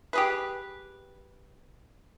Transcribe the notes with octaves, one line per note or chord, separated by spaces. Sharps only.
G4 G#4 B4